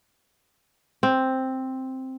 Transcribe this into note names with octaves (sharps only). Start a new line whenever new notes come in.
C4